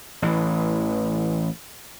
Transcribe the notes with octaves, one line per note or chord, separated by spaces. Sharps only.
A1 E3